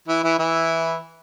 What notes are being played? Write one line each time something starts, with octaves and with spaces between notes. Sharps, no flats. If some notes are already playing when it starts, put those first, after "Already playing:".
E3 E4
E3 E4
E3 E4